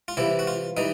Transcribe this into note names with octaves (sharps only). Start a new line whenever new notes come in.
F4
C3 E3 G3 E4
F#4
F4
E3 G3 D#4